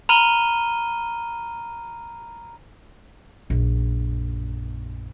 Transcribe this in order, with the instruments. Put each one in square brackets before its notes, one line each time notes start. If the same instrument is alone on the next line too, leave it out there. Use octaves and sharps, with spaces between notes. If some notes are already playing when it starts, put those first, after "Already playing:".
[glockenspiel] A#5 B5 F6 D#7 G7
[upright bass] A#1 F#2